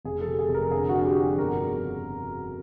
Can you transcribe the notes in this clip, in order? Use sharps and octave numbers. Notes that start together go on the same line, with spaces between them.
F1 G#4
A4
C3
G#4
F1
A#4
D3 G#4
F#4
D3
G#4
G4
F3
G#4
G1 A#4
C#3